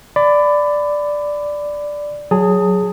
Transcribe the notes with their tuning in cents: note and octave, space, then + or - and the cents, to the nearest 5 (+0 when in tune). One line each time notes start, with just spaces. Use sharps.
D5 +0 B5 +25
F#3 +0 G#4 +0 A5 +35